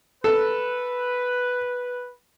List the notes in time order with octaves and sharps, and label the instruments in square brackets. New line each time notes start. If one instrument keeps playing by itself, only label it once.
[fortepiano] A4 [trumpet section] B4